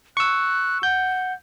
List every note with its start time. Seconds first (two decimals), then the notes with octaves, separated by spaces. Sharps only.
0.17 C#6 E6 F#6
0.83 F#5 G6